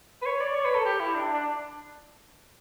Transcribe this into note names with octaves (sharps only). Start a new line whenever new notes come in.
B4
C#5
D5
C#5
B4
A4
G4
E4
D4
D4